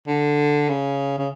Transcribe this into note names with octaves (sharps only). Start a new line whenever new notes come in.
D3
C#3
C#3